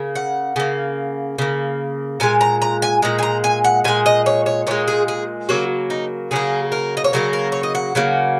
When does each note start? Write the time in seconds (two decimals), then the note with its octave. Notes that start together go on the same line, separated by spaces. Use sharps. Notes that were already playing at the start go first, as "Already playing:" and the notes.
Already playing: C#3 A#3
0.16 F#5
0.56 C#3 A#3
1.38 C#3 A#3
2.20 A#2 G#3 G#5
2.41 A#5
2.62 A#5
2.82 G#5
3.02 A#2 G#3 A#5
3.19 G#5
3.23 A#5
3.44 G#5
3.64 F#5
3.84 A#2 G#3 G#5
4.06 D#5
4.26 C#5
4.46 C#5
4.67 A#2 G#3 C#5
4.88 G#4
5.08 G#4
5.49 C#3 F#3 A#3 F#4
5.90 D#4
6.31 C#3 F#3 A#3 G#4
6.72 A#4
6.97 D#5
7.04 C#5
7.13 C#3 F#3 A#3 A#4
7.33 A#4
7.52 C#5
7.63 D#5
7.75 F#5
7.95 C#3 F#3 A#3